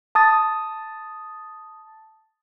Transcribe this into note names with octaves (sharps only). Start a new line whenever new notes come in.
A5 D#6 A6